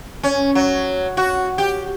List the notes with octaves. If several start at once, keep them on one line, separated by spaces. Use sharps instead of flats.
C#4
F#3
F#4
G4